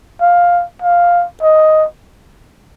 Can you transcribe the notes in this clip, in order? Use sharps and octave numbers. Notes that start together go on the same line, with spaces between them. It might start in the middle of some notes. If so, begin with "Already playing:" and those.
F5
F5
D#5